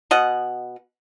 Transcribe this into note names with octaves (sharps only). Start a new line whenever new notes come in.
B2 D#5 F#5